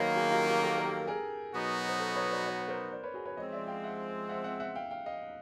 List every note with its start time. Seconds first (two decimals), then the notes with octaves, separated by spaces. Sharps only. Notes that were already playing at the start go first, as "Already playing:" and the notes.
Already playing: D#3 F#3 A#3 B4 C#5 D#5
0.16 F#4 G#4
0.31 F4 G4
0.46 F4 G4
0.62 G4 A4
0.78 A#4
0.84 G4 A4
1.07 G#4 A#4
1.54 B2 F#3 B3 D#4 F#4
1.89 C5
2.00 A4 B4
2.15 B4 C#5
2.30 C5 D5
2.46 B4 C#5
2.60 B4
2.68 A#4 C5
2.91 C5 D5
3.03 B4 C#5
3.14 F#4 G#4
3.25 B4 C#5
3.37 F3 G#3 C4 C#5 D#5
3.52 D5 E5
3.68 F5 G5
3.84 E5 F#5
4.29 E5 F#5
4.44 E5 F#5
4.60 E5 F#5
4.75 F5 G5
4.91 F5 G5
5.06 D#5 F5